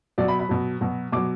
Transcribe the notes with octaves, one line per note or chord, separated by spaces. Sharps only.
B2 F#3 D5
B5
B5
B2 F#3
B2 F#3
B2 F#3 D6